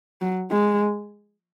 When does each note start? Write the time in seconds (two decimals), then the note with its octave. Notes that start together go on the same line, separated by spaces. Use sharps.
0.21 F#3
0.51 G#3